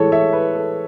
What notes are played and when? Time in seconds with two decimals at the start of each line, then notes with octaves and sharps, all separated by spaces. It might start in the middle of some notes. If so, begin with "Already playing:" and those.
Already playing: A2 E3 G#3 A4 C#5
0.12 C#5 E5
0.33 B4
0.55 A4